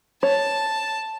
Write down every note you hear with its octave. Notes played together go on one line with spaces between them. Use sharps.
C#5 A5